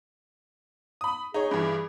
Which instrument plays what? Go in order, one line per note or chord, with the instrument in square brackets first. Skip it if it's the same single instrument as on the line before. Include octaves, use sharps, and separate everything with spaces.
[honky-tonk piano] B5 D#6
[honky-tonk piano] D#4 C#5 [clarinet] G#4
[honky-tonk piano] G2 E3